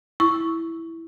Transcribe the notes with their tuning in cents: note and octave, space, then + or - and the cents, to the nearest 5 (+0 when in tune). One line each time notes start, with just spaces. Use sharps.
E4 +0 C#6 +0